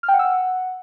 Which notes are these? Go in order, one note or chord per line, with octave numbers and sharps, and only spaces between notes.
F6
G5
F#5
E6
F#5